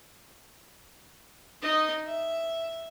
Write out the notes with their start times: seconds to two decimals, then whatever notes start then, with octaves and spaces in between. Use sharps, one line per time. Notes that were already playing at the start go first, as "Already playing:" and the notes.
1.62 D#4 D#5
2.07 E5